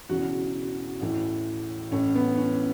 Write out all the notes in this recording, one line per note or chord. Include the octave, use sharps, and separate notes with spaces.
E1 E2 C#3 E3 F#4
A1 A2 E3
A1 A2 E3 C#4
B3
C#4